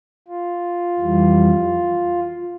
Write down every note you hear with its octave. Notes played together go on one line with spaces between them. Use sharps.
F4
F2 E3 G3